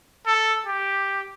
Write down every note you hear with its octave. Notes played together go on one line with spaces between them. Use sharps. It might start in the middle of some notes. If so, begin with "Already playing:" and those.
A4
G4